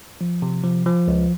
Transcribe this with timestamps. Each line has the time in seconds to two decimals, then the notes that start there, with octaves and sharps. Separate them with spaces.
0.21 F3
0.42 C3
0.64 F3
0.86 F3
1.08 C#2